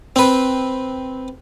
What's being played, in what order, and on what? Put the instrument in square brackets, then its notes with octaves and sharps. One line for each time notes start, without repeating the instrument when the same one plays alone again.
[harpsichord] C4 B4